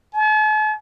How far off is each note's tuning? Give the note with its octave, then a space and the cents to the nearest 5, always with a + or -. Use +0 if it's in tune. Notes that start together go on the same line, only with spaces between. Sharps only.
A5 -45